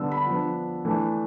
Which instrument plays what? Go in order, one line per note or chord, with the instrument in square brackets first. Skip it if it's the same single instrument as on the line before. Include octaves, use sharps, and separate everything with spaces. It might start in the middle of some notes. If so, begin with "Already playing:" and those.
Already playing: [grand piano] D3 G3 B3 D4 E6
B5
F3 B3 D4
E3 A3 D4